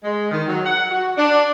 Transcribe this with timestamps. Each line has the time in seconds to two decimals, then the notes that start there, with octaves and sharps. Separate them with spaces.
0.04 G#3
0.31 D#3
0.48 F#3
0.65 F#5
0.91 F#4
1.17 D4